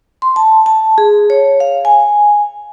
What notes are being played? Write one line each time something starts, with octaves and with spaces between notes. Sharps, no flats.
C6
A5
A5
G#4
C#5
F5
G#5